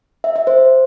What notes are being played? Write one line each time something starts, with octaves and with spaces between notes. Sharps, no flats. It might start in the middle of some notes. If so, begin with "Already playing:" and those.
E5
E5
C5